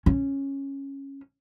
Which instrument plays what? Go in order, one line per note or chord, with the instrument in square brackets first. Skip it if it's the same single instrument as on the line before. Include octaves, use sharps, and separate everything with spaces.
[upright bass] C#4